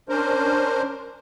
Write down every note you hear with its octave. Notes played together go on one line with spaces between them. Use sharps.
C#4 D4 A#4 C5